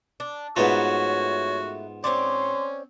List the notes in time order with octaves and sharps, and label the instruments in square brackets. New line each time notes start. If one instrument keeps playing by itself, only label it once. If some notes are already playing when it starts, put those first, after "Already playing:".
[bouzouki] D4
[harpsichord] G#2 B3 F4 [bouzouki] A3 A#4 B4 [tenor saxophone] F#4 [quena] C#5
[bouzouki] C4 C#5 D5 [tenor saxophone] C#4 [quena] C6